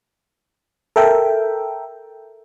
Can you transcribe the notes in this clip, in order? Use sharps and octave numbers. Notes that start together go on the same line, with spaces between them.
A4 A#4 E5 G5